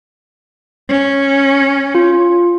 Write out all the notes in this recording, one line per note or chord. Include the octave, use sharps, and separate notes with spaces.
C#4
F4